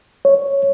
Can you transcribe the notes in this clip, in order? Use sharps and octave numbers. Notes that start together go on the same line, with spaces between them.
C#5